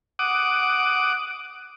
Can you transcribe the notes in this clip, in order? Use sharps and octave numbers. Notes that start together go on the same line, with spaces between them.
F#5 D6 D#6